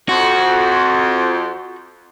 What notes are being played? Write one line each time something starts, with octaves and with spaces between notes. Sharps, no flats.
F2 F#4